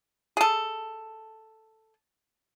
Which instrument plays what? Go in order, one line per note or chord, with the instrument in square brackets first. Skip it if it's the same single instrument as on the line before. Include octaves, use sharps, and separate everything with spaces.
[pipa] G#4 A4